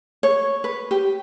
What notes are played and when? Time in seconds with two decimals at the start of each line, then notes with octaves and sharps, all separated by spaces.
0.23 C#5
0.64 B4
0.91 G4